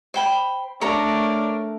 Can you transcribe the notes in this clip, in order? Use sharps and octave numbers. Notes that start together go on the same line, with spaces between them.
C5 G5 B5
A3 D4 A#4 C#5 A#5